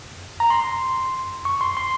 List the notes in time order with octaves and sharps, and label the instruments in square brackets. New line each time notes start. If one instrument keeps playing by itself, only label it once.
[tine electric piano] A#5
C6
C#6
C6
C6